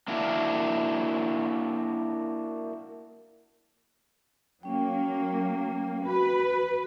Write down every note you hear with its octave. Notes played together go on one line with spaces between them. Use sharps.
A#3 D4 E4 F#4
F#3 A#3 C#4 G5
F#4 B4